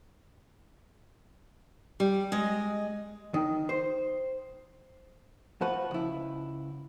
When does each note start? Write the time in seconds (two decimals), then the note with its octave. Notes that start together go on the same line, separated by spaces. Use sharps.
2.00 G3
2.32 G#3 D#5
3.34 D#3
3.69 C5
5.61 F3 F#4 B4
5.91 C#2 E4